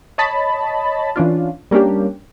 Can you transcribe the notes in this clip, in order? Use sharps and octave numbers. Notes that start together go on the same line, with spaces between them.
C#5 D#5 A5 B5
E3 C#4 D4 F4
G3 A#3 C#4 D4 G4